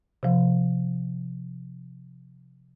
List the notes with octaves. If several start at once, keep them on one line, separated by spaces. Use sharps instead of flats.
C3 F3